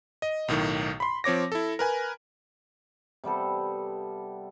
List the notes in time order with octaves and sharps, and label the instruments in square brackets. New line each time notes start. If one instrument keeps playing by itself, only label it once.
[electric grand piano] D#5
B1 A2 D#3
B5 C6
F3 C4 C#5 D6 A#6
E4 A4
A#4 B4 G#5
[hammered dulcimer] C3 G3 B3 A4